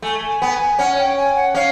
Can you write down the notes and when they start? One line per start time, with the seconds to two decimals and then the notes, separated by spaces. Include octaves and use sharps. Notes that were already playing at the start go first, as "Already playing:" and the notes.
0.02 A3 G#5
0.28 G#5
0.42 B3
0.54 G#5
0.79 C#4 F#5
0.98 G5
1.17 G#5
1.36 F#5
1.55 C#4 F5